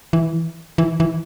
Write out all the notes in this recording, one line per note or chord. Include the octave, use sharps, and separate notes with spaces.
E3
E3
E3